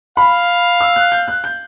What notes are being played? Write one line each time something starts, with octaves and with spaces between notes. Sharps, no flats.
F5 B5
E6
F#6
G6
F#6
G6